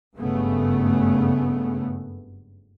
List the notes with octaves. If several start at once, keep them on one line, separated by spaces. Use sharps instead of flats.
F#1 G2 C#3 A3 B3